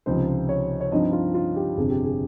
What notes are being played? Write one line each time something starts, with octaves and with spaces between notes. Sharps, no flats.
C#2 C3 F3 C4 D#4 C5
C#5
C#5
G2 F3 C4 D#4 D#5
F4
F4
G4
G1 F2 C3 G#4
G4
G#4